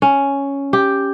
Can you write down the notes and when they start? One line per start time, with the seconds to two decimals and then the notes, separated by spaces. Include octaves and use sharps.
0.02 C#4
0.73 G4